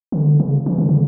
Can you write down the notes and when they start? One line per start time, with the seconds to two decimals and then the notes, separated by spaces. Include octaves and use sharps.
0.12 D3
0.40 C#3
0.66 E3
0.78 D3
0.89 C#3